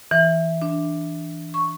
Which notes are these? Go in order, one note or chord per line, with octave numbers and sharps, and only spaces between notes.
E3
D4
C#6